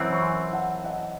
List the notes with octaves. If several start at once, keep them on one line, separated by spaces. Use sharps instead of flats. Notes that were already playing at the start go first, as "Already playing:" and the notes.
Already playing: F#2 E3 C4
C#6
G#5 C6
F#5 A5
D#5 F#5